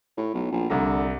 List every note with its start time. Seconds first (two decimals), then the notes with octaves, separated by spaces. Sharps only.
0.17 A2
0.34 B1
0.52 A#1
0.70 C2 D3 A#5